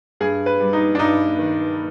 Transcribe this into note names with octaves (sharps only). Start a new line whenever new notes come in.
G2 G#4
B4
G3
D#4
D4
G2 D#4
D#3